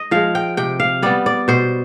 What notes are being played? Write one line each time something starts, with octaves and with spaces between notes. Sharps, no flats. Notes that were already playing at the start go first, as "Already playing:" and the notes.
Already playing: D#5
F3 G#3 F5
G5
C3 G5
F5
G3 B3 D5
D5
B2 C5